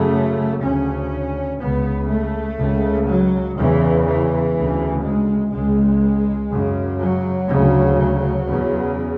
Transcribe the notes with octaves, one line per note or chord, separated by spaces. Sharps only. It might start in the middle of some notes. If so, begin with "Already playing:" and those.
Already playing: F#2 C#3 A3
D2 C#3 C#4
C#2 C#3 B3
A3
C#2 C#3
F#3
E2 C#3 E3
E3
D2 C#3
G#3
C#2 C#3 G#3
F#2 C#3
F#3
D2 C#3
F#3
E2 C#3